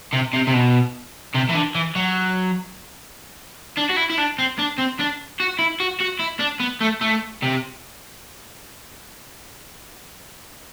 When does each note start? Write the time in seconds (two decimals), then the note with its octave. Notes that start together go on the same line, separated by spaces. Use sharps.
0.13 C3
0.34 C3
0.47 C3
0.54 B2
1.34 C3
1.49 E3
1.54 D3
1.75 E3
1.95 F#3
3.78 D4
3.90 F#4
3.97 E4
4.10 E4
4.18 D4
4.38 C4
4.58 D4
4.78 C4
4.99 D4
5.40 F#4
5.59 E4
5.80 F#4
6.00 F#4
6.20 E4
6.40 D4
6.60 B3
6.81 A3
7.01 A3
7.42 C3